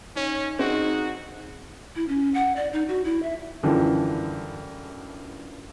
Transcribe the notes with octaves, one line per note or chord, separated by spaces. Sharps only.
C#4 D#4 C#5
C4 D#4 F#4 G#4
E4
C#4
F#5
D5
D#4
F#4
E4
E5
F#2 D3 E3 F3 G3